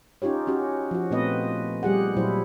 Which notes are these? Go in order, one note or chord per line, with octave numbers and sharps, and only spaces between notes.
C#4 D#4 F4 G4 C#5
C#4 F#4 G4
F3 F#4
A#2 A3 B3 C4 B4 D#5
G3 G4 G#4 F#5
A#2 F#3 E4 C5